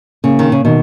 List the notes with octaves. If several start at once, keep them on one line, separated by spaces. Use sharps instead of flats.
C#3 A#3
D#3
C#3
B2 D#3